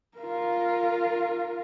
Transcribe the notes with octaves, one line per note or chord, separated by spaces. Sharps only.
F4 A#4